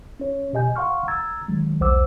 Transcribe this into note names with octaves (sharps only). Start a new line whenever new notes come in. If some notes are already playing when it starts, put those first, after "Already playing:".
C#4 C#5
B2 G4 D#5 G#5 G6
F5 F#5 C6 C#6 F6
A#5 E6 G#6 A6
D#3 F#3 G#3
B1 E2 C5 F#5 D6 E6